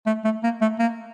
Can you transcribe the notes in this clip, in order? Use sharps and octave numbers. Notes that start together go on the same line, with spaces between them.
A3
A3
A#3
A3
A#3